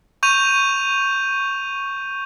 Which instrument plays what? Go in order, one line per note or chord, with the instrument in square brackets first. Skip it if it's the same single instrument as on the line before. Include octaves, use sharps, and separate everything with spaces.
[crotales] C#6 G6 D#7 F7